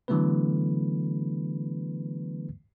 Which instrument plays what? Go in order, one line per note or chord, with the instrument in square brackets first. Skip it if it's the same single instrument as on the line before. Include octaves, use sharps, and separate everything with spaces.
[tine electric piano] D3 E3 F#3 A3 B3 B4